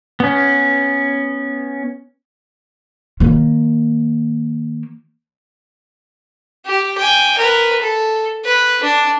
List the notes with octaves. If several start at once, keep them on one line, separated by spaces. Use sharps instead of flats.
B3 C#4
D#3 A#3
G4
G5 G#5
A#4 B4
A4
B4
D4